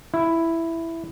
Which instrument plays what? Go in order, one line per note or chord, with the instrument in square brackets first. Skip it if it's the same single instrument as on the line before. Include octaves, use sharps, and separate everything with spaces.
[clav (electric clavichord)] E4